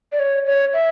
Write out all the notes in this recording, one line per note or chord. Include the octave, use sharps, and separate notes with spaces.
D5
C#5
C#5
E5